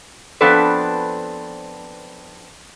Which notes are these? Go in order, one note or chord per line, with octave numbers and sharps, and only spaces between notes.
F3 B3 C4 D4 A4 B4